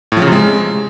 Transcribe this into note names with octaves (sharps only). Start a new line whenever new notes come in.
A2
F3
C#3
C3
G#3